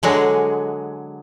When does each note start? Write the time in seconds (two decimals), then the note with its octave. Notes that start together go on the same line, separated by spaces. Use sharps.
0.03 D3 F#3 G#3